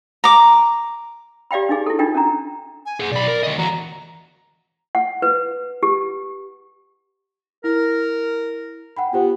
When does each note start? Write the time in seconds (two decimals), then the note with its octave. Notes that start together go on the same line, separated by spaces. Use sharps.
0.24 A#5 D6
1.51 G4 D5 F5 G5 B5
1.69 D4 D#4 G#4
1.86 E4 A4
1.99 D4 D#4 F4 A#4 G5
2.15 C#4 D4 A#5
2.86 G#5
3.00 G#4 F#5
3.11 B1 D5 B5
3.28 A#4
3.43 D2 D#5
3.58 E2 F#4 A#5
4.95 F#5
5.22 B4
5.83 G4
7.64 E4 A#4
8.97 F#5 G5 B5
9.13 B3 F4 G4 C5